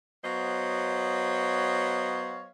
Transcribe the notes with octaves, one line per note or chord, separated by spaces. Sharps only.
F#3 B3 C5 C#5 D#5 F5